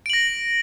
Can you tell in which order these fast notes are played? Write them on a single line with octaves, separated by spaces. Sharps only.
D7 F#7 A#6